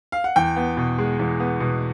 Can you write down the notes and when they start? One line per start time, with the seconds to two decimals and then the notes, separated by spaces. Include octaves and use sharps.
0.12 F5
0.24 F#5
0.36 E2 G5
0.56 B3
0.77 B2
0.98 G#3
1.20 E2
1.40 B3
1.60 B2